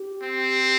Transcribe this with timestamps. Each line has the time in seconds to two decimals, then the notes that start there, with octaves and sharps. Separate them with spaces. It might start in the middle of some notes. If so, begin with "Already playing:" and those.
Already playing: G4
0.22 C4